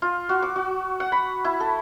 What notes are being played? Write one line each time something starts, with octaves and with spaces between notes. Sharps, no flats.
F4
F#4
D6
F#4
F#5
B5
E4
A4